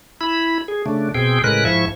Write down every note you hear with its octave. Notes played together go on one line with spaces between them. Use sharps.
E4 B5
G#4
C#3 A3 D4
B2 C4 G#4 G5
A2 C#3 G#3 A#4 B4 F#6
G#2 F3 E4 E5 C#6